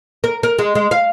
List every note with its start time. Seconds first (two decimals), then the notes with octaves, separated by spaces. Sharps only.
0.24 A#4
0.43 A#4
0.59 G#3
0.75 G#3
0.91 F5